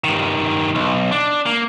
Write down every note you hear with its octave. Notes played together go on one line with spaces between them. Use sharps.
G2 D#3
B1
D4
A#3